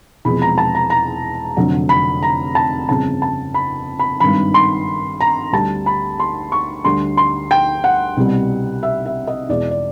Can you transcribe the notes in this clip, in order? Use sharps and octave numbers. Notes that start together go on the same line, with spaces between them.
E1 E2 C3 F3 G#3 B5
A#5
A5
A#5
A#5
F1 F2 D3 F#3
B5
A#5
A5
G1 F2 C#3 A5
A5
B5
B5
G#1 G2 D#3 B5
C6
A#5
D2 D3 G3 A5
B5
C6
C#6
D2 D3 G3 C6
C6
G5
F#5
C2 B2 G3
E5
E5
D#5
E2 B2 G#3 D5
D5